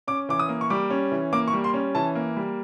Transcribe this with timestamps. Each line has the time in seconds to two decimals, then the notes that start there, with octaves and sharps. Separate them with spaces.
0.07 C#4 D6
0.29 E3 D6
0.40 D#6
0.49 A#3
0.61 C#6
0.70 G3 D6
0.90 C#4
1.12 E3
1.33 A#3 D6
1.48 C#6
1.53 G3
1.64 C6
1.74 C#4
1.95 E3 A5
2.15 A#3
2.37 G3